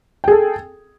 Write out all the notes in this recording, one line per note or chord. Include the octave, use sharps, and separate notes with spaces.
G#4 A4 G5